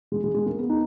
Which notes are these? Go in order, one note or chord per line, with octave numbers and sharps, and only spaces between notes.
G#3
G#3
G#3
A#3
B3
D#4